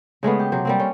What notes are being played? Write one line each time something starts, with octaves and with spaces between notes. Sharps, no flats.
C#3 G#3 A3 B3
G4
C3 F#3 C5
G3 A#3 C4
C#4